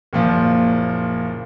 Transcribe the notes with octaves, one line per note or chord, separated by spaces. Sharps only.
F#1 A#2 F3